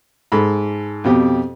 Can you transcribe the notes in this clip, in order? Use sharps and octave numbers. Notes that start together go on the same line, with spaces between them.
G#2 A4 B5
F2 B2 G4